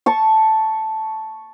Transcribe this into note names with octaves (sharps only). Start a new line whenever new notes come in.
A5 C#6